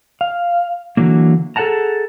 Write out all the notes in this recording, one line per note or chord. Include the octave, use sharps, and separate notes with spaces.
F5
D3 E3 F#3 A#3
G#4 A4 B4 F#5 A5 A#5